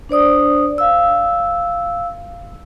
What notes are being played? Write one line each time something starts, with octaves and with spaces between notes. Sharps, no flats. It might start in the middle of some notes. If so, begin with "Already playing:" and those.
D4 C5 D5 D#6
F5 E6